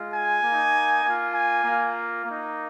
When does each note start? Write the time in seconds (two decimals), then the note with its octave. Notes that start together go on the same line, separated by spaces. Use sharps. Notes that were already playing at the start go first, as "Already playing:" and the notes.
Already playing: G#3 F4
0.13 G#5
0.43 A#3
0.48 D#4
1.04 A#3 F4
1.34 G#5
1.64 A#3 F4
2.25 A#3 D#4